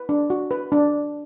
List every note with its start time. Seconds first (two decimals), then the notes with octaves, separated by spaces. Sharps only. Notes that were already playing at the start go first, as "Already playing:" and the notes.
Already playing: B4
0.09 D4
0.30 F#4
0.51 B4
0.72 D4